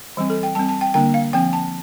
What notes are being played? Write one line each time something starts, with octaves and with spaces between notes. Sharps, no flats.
E3 G3 C4
A4
G5
G3 C4 A5
A5
G5
D3 G3 A#3 D4 G5
F5
F3 C4 G5
A5